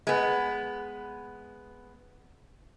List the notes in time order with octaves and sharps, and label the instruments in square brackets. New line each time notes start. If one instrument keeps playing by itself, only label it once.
[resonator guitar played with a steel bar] G#3 B3